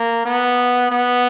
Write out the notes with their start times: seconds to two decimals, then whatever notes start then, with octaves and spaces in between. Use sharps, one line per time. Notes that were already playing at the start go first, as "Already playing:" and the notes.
Already playing: A#3
0.26 B3
0.91 B3